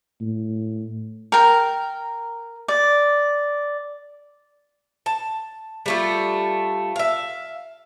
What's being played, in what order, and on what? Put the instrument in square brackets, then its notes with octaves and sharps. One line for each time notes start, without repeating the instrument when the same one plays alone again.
[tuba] A2
[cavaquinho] A#4 G5
D5
[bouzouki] A5
G3 A3 F4
E5 F5